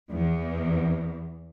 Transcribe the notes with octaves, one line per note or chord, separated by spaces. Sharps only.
E2